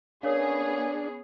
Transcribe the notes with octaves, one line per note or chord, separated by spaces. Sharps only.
B3 C#4 D4 G#4 A#4 C#5 F5